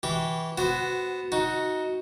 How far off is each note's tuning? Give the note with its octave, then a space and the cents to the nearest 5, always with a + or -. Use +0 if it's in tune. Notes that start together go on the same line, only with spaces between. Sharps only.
E3 -15 G4 -25 C#6 -30
B3 +15 F#4 +0 C5 +0
D#4 +15 F#4 +0